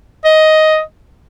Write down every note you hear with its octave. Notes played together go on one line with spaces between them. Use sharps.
D#5